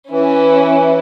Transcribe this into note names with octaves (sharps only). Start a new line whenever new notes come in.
E3 C#4 E4